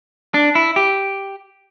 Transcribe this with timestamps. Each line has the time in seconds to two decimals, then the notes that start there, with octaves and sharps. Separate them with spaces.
0.34 D4
0.55 E4
0.76 G4